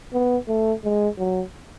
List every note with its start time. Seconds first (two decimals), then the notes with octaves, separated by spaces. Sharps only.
0.13 B3
0.48 A3
0.84 G#3
1.18 F#3